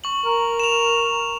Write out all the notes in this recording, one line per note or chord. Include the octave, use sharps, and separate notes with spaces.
C#6 F#7
A#4
E7 F7